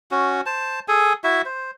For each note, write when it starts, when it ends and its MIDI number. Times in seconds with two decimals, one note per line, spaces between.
0.11 0.41 61
0.11 0.41 66
0.46 0.80 72
0.46 0.80 81
0.88 1.13 68
0.88 1.13 69
0.88 1.13 80
1.24 1.42 64
1.24 1.42 66
1.24 1.42 76
1.45 1.71 72